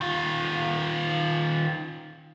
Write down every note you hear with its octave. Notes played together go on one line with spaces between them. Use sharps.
D#3 F4